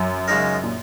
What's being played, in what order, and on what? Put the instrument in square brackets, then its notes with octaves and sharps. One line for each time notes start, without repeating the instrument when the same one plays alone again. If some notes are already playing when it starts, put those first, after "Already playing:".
Already playing: [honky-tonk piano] F#2
[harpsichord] C#3 G#3 D#4 A#4
[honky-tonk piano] A#2